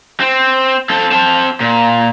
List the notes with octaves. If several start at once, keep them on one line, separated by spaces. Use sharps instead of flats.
C4
C4 A4
C4 A5
A#2